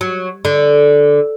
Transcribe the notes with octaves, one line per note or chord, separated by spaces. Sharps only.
F#3
D3